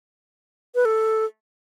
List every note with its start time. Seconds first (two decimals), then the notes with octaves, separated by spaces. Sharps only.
0.75 B4
0.85 A4